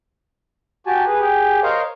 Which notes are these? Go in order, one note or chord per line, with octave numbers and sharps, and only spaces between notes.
F#4 G4 G#5 A5
G#4 B4
G4 G#4
A#4 C5 C#5 D#5 F5